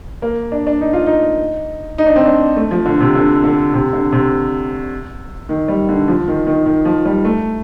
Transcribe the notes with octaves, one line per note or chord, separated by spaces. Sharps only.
A#3
D4
D4
D#4
F4
D#4
D#4
D4
C4
D4
A3
F3
D3
C3
D3
D3
C3
D3
C3
D#3
G3
D3
F3
D#3
D#3
D#3
F3
G3
A3